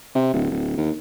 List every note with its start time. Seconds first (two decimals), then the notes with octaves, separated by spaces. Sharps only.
0.15 C3
0.33 D1
0.51 D1
0.78 D#2